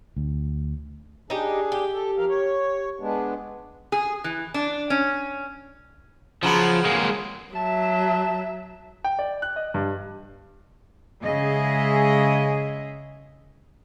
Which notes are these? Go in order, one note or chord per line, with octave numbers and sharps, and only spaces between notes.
D2
D4 D#4 G4 G#4
G4
A4
F3 A#4 F5
C#5
G#3 B3 D4
G#4
E3
D4
C#4
C#3 F3 F#3 B3
G#3 A#3
F#3 E5 A5
G5
D5
F#6
D#5
G2
C#3 G#3 G#4 D#5 E5